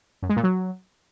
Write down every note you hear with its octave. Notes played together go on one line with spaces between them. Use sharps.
F#2
G#3
A#2
F#3